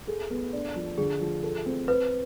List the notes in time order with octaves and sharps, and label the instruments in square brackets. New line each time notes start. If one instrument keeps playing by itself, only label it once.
[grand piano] G#4 [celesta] A4
[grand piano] B3
D4
F3
[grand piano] D3 [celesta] G#4
[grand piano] F3
A4
C4
[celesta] B4 [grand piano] C5